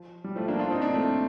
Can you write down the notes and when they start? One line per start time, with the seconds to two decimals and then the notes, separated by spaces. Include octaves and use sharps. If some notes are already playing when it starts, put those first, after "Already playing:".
Already playing: F3
0.24 G3
0.36 F3 A3
0.48 A#3 D4
0.59 D4 F4
0.70 C4 D#4
0.82 A#3 D4
0.94 A3 C4